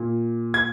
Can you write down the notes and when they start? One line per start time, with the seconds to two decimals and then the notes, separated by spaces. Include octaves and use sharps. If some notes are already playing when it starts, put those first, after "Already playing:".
Already playing: A#2
0.54 G#6